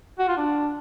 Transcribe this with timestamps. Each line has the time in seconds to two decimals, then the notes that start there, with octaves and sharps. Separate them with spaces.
0.19 F#4
0.28 F4
0.38 D4